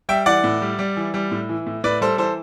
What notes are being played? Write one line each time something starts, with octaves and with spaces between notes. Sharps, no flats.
G3 E5 G5
E3 D5 F#5
A2
G3
G3
E3
G3
A2
E3
A2
A2 B4 D5
G3 A4 C5
E3 A4 C5